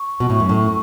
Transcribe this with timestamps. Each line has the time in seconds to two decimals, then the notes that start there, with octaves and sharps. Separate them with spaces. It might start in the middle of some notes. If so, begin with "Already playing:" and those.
Already playing: C#6
0.20 B2
0.30 A2
0.40 F#2
0.49 A2